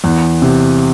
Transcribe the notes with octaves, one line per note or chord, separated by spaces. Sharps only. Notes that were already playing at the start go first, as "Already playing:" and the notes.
E2
C3